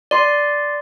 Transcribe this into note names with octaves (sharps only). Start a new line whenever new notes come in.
D5 C6